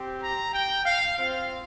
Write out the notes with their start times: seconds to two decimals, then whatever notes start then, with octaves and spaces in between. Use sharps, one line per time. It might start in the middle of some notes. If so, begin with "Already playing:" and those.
Already playing: C4 G4
0.20 A#5
0.52 G5
0.84 F5
1.16 C4 F4 F5